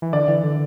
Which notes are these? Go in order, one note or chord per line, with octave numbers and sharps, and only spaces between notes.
E3
D3 D5
E3
D3